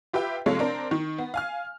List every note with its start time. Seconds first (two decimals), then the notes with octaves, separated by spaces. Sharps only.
0.13 F4 G4 B4 E5 G5
0.46 C3 F3 G#3 A3 C#5 F5
0.59 C4 D4 A#4
0.91 D#3
1.18 B3
1.34 F5 G#5 F6